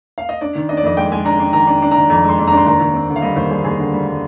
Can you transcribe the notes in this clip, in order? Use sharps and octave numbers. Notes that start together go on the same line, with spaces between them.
F5
D#5
D4 D5
D#3
D4 D#5
D5
F2 D#5
G#3 G5
G#3 G#5
D4 A#5
D4
D#3 A#5
D4
D4
D#3 A#5
F2 A#5
G#3 C6
F2
D4 A#5
C6
D#2 A#5
D#2
C4
D3
F5
G3 D#5
D#2 C5
G3 G#4
D#2 G#4
D3
G3
G3